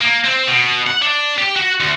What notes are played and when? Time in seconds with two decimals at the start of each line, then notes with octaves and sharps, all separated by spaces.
0.01 A#3
0.24 C4
0.48 B2
0.87 F#5
1.02 D4
1.38 G4
1.56 F#4
1.80 D2